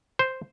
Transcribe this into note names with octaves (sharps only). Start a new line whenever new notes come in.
C5